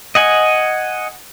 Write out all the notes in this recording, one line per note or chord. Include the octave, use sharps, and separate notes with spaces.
D#5 F#5 G#5